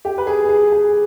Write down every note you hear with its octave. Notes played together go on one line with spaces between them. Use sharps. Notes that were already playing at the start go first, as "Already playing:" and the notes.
G4
B4
G#4
G#4
G#4